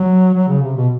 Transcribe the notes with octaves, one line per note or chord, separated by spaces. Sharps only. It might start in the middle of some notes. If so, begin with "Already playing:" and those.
Already playing: F#3
F#3
C#3
C3
B2